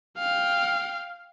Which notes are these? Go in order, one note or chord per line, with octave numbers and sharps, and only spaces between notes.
F5 G5